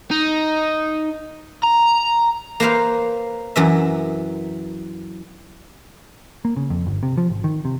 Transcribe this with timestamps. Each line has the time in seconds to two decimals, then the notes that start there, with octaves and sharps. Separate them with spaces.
0.11 D#4
1.64 A#5
2.60 A#3 B4 C5 F5
3.56 F#2 E3 E5
6.45 A#3
6.57 C#3
6.70 F2
6.87 G1
7.03 C3
7.18 F3
7.30 G#1
7.44 D#3
7.65 C3